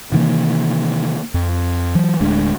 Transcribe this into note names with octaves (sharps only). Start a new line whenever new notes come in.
C3 D#3 E3 A#3
F2
E3 F#3
D1 D2 G#3 D4